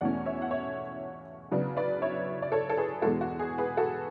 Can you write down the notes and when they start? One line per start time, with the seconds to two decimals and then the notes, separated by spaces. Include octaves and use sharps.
0.01 E2 B2 A3 C#4 D5 F#5
0.26 C#5 E5
0.42 F#5
0.51 C#5 E5
1.51 C#3 F#3 B3 D4
1.77 B4 D5
2.02 C#5 E5
2.42 D5
2.52 A4 C#5
2.69 A4
2.77 G#4 B4
3.02 E2 B2 G#3 F#4 A4
3.21 F#4
3.39 G#4
3.58 G#4 B4
3.77 F#4 A4